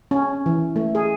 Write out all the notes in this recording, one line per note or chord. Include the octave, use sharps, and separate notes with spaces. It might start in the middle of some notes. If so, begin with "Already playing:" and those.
C#4
E3
A3
G#4